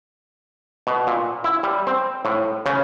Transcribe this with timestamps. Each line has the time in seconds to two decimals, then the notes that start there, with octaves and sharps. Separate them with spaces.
0.87 B2
1.07 A#2
1.44 E4
1.63 G3
1.87 C4
2.25 A2
2.66 C#3